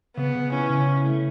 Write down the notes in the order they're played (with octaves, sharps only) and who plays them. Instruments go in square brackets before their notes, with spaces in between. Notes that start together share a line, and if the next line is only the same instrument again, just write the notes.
[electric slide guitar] C#3 [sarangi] B3
[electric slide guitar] C#3
[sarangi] C#4 [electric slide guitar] E4
[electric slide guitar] C#3
E4
A3